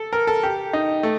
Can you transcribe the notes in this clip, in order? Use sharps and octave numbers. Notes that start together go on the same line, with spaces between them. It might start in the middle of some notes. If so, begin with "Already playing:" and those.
Already playing: A4
A#4
A4
G4
D#4
A3